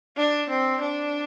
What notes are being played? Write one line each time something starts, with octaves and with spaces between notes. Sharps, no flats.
D4
C4
D4